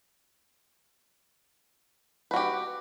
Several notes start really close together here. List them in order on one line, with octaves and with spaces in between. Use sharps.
B4 F#4 G4